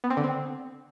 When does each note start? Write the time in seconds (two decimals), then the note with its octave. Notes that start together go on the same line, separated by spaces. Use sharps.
0.04 B3
0.10 C4
0.17 D3
0.24 C4